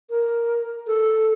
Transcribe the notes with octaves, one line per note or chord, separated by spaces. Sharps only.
A#4
A4